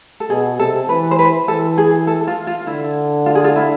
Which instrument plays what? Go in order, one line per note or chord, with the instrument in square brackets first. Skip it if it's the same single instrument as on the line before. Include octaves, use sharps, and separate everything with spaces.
[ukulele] A4
[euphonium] B2 [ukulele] G#4
[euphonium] C3 [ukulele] A4
[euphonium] E3 [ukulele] B4
[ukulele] C5
B4
[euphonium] E3 [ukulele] A4
[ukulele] G#4
A4
F4
F4
[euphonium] D3 [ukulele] E4
[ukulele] F4
G#4
F4
E4